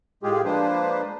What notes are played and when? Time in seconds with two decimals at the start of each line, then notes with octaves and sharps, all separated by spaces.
0.23 A2 G#3 F4 G4 G#4
0.45 F3 G#3 A#3 D4 B4 C5